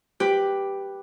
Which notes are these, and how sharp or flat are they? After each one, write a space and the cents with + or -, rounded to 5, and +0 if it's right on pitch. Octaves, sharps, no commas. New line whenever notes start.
G4 +0 B4 +0